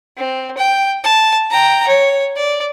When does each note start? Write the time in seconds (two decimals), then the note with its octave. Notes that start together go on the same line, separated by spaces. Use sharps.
0.17 C4
0.58 G5
1.04 A5
1.50 G5 A#5
1.88 C#5
2.36 D5